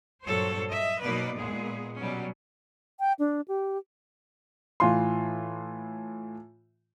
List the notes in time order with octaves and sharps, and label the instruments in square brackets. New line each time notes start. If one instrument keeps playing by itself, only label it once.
[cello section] G2 A#2 F#3 A4 C5 C#5
D#5 E5
B2 F#3 A#3 D#4 B4 D5
A#2 G#3 B3 G#4
B2 F#3 G3 C#4
[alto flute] G5
D4
G4
[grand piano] A2 E3 F4 C6